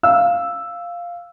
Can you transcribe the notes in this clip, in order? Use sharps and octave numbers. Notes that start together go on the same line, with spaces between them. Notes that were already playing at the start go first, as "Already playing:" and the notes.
F5 E6